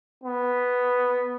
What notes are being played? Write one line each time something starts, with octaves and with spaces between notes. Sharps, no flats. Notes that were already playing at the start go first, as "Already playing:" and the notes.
B3